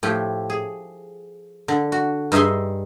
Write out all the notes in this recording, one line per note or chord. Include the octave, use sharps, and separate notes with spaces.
A2 F3 G4
G#4
D3
F#4
G2 D#4 G#4 E5 C6